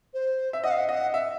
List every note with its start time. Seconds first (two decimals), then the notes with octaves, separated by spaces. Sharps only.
0.13 C5
0.53 E5
0.64 D#5 F#5
0.71 F5
0.79 F#5
0.89 D#5 F#5
1.14 E5